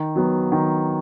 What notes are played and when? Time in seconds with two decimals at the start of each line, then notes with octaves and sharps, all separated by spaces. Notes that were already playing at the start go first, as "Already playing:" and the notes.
Already playing: D#3
0.16 F#3 B3
0.52 D#3